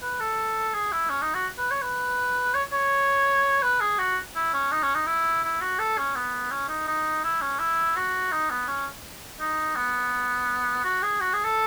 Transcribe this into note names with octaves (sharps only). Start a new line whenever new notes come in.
B4
A4
G#4
E4
C#4
D#4
F#4
B4
C#5
B4
C#5
C#5
B4
G#4
F#4
E4
C#4
D#4
C#4
D#4
E4
E4
F#4
A4
C#4
B3
C#4
D#4
D#4
E4
C#4
E4
F#4
D#4
B3
C#4
D#4
B3
F#4
G#4
F#4
G#4
A4